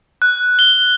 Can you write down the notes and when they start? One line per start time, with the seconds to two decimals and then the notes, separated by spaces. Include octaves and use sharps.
0.22 F#6
0.59 G7